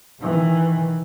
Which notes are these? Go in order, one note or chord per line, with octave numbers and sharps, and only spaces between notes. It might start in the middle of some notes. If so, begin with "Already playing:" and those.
D#3 E3